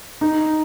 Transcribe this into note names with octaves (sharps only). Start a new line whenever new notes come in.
D#4